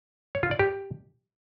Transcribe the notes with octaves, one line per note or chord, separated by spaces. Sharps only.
C#5
F4
D5
G4